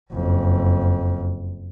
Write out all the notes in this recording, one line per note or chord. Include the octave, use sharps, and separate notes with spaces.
F#1 F2